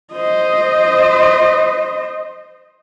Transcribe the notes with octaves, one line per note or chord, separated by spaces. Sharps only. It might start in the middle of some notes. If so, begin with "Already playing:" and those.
C5 D#5